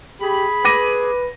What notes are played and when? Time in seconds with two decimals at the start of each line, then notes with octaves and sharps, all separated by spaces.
0.21 G4 G#4 B5
0.65 B4 D6 A#6 D#7